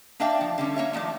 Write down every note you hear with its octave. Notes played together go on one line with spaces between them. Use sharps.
A#3 D4 D5 E5 F5 G5
F3
D3 G3 C#4
A#3 C#5 E5
D#3 F3 A3 D5